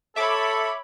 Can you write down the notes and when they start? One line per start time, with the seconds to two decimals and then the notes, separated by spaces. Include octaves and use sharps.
0.16 A4 C#5 E5 B5 D6